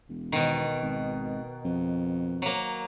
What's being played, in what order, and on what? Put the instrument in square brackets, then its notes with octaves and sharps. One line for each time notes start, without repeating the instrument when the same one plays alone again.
[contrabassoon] E1
[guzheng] B2 D#3
[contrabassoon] G#1
F2
[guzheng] F#3 A#3